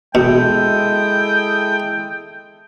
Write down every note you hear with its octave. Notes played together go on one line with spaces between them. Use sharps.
B2 G#3 E4 A4 G5 D#6